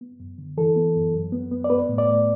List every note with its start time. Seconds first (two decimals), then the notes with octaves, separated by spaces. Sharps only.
0.01 B3
0.20 F#2
0.38 D3
0.57 E3 A4
0.76 B3
0.95 F#2
1.14 F#2
1.32 B3
1.51 B3
1.64 D5
1.70 B3 B4
1.89 A2
1.98 D5
2.08 A2